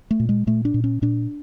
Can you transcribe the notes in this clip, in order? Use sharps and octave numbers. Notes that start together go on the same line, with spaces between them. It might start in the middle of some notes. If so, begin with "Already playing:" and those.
A3
A#2
G#3
A#2 A3
D4
A#2
C#4
A#2 D4